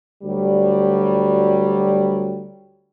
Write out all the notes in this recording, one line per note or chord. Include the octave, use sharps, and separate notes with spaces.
D2 F#3 G3